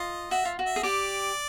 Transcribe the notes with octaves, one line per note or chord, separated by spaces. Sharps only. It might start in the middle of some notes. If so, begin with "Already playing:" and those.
Already playing: F4 D#5
F#4 E5
F4
F#4
E5
G#4
G4 D5